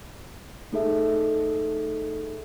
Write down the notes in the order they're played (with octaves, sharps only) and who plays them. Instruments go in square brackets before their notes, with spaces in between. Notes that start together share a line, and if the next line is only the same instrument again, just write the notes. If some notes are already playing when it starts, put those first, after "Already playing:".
[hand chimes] A3 D#4 G#4 A4 E5